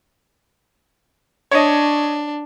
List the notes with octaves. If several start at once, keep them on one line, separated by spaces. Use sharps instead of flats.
D4 C#5 D#5